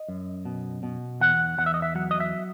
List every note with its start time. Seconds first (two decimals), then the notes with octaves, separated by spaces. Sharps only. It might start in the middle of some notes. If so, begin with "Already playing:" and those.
Already playing: D#5
0.09 F#2
0.45 B2
0.83 B2
1.21 E2 F#5
1.58 E2 F#5
1.66 E5
1.74 D#5
1.82 E5
1.95 F#3 F#5
2.11 D#5
2.20 E5